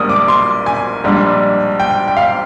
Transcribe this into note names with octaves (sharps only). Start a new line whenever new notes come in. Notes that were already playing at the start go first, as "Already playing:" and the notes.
Already playing: A#1 G#2 G3 A#3 D4 D#6 F6
D6
C6
G#5
A#1 G#2 G3 D4
G5
G5
F5